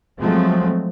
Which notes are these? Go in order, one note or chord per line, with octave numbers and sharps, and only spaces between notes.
F3 F#3 G#3 A3 C4